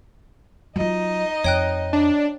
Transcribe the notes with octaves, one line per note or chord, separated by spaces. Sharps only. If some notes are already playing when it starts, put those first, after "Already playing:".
F#3 D#4 F4 D#5
F2 C#5 G5 F#6
D4